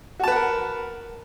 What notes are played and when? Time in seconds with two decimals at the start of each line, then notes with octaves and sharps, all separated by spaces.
0.19 F#4
0.24 A5
0.28 B4
0.32 F#5
0.36 A#4